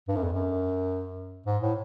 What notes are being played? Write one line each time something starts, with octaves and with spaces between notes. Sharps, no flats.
G2
F#2
F2
F#2
G#2
A2